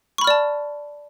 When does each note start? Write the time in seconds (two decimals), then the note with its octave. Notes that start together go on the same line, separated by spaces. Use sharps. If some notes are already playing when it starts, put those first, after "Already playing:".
0.18 C#6
0.21 B5
0.24 F6
0.27 D5
0.30 A5